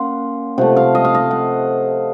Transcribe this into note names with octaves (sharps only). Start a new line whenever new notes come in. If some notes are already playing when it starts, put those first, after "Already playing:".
Already playing: A#3 C#4 F#5 C6
C3 F3 A3 F#5
F5
D#5
F5
D#5
F#5